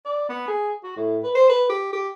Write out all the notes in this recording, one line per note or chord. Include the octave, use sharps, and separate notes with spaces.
D5
B3
G#4
F#4
A2
B4
C5
B4
G4
G4